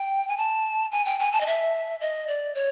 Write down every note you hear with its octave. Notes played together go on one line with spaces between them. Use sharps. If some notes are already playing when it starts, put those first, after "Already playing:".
Already playing: G5
G#5
A5
G#5
G5
G#5
A5
D#5
E5
D#5
D5
C#5